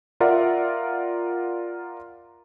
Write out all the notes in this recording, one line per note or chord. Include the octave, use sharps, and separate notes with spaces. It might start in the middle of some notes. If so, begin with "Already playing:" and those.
F4 A#4 D5 E5 F#5